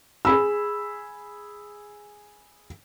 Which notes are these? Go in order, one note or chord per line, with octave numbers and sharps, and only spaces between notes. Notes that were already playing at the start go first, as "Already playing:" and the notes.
G#4 B5 E6